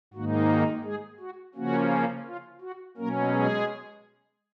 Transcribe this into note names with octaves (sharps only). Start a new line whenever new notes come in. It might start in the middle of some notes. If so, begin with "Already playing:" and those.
G#2 D#3 A#3 D#4 F#4
F#4
G#3 G#4
F#4
C#3 F3 A#3 C#4 F#4
F4
F#4
B2 F#3 A#3 C#4 A#4
G#3 G#4